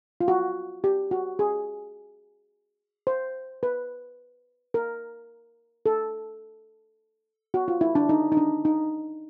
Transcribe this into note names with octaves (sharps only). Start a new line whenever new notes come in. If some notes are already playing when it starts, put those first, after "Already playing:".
F4
F#4
G4
F#4
G#4
C5
B4
A#4
A4
F#4
F4
E4
D4
D#4
D#4
D4
D#4